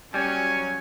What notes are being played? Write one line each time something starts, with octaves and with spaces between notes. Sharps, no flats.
F#3 G3 C#4 C#5 G#5